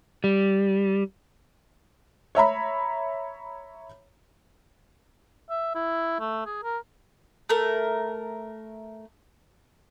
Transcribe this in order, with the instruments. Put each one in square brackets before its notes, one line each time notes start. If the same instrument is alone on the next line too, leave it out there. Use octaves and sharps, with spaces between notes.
[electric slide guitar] G3
[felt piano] C#5 E5 A#5 B5
[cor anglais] E5
E4
A3
G#4
A#4
[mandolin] A3 A#4